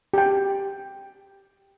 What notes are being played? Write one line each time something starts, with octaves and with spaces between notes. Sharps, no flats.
G4 G5